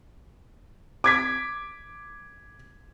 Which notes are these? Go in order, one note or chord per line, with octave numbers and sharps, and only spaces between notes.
D6 G#6 B6